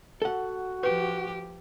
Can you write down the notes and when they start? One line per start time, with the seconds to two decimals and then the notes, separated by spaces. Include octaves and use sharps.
0.22 F#4 A4 F#5
0.83 F3 G4 B4